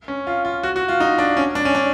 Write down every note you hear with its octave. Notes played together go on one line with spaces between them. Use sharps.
C#4
F4
F4
F#4
F#4
F4
D#4
D4
C#4
D4
C#4
D4